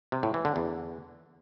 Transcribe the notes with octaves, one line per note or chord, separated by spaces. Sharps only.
C3
A2
E3
D3
E2